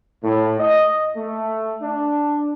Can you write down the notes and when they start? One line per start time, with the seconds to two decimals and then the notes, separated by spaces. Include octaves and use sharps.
0.23 A2
0.60 D#5
1.16 A3
1.82 D4